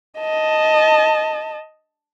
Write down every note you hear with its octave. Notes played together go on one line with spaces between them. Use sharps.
D#5 A5